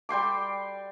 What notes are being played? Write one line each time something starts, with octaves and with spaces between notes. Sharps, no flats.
G3 G5 C6 D6